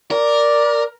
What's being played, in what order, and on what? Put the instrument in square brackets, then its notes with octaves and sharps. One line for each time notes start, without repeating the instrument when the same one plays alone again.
[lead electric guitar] A#4 [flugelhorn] D5